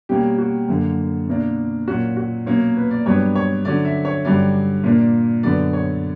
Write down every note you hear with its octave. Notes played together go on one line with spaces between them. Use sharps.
B2 G3 A#3 C#4 G4
F#4
F#2 D3 A#3
B2 A#3 D4
A#2 F#3 C#4 F#4
F#4
B2 F#3 A#3 C#4
B4
D5
G2 F#3 B3 D4 C#5
C#5
D3 F#3 C#4 D5
E5
C#5
G2 D3 F#3 C#4 D5
A#2 A#3 D4
F#2 D3 F#3 B3 D5
C#5